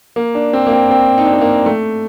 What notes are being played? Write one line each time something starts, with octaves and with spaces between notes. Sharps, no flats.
A#3
D4
C4
A#3
C4
C4
D#4
D4
C4
A#3
A3